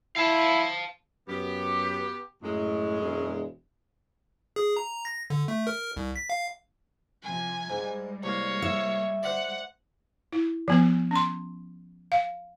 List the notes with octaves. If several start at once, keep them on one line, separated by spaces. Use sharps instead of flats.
E4 F5 A5
F#2 B3 G4
F#2 A2 G#3
E1
G#4
A#5
A#6
D3
A3
A#4
C2
B6
F5
C3 F3 G#5
G#2 G3 G#3
C2 A#3 C#5
E5
C5 D5 F#5
E4
F3 B3 G#5
C#4 C6
F5